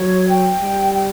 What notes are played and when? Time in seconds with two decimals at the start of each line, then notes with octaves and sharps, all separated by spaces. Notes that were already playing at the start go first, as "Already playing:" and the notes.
Already playing: F#3 C#5
0.29 G5
0.61 G3
0.93 G5